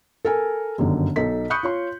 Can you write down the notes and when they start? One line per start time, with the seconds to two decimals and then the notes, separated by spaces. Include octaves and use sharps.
0.25 A4 A#4 G#5
0.78 G1 F#2 D3 D#3
1.16 B1 D#4 A4 B6
1.50 B5 C#6 D#6 F#6 G6 C#7
1.63 F4 C#5 C6